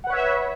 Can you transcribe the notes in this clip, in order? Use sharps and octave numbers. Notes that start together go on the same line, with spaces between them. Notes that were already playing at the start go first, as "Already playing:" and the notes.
B4 C#5 E5 F#5